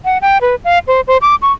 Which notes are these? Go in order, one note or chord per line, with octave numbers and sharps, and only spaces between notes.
F#5
G5
B4
F5
C5
C5
D6
C#6